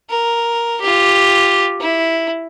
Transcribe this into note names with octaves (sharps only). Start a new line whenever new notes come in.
A#4
F4 G4
E4